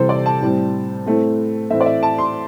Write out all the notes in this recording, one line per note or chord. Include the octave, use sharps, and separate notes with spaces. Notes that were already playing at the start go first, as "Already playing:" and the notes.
Already playing: C3 E3 G3 C4 A4 C5
D5
A5
A2 G3 C4
A2 A3 C4
A2 E3 A3 C4 E5
D5
E5
A5
C6